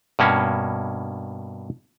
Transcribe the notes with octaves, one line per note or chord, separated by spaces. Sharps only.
G2 B2 A#3 C#4